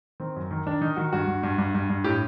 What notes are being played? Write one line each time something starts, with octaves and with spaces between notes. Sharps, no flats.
D#3 C4
F#2
D#3
D#3 D4
D#3 D#4
D#3 F#4
G2 F#4
G2
G2
G2
G2
G2
A2 G4